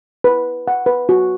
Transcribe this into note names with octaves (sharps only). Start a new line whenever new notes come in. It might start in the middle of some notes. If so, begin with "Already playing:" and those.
B4
F#5
B4
F#4